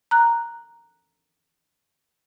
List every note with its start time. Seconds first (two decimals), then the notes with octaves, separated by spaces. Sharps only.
0.11 A#5 F#6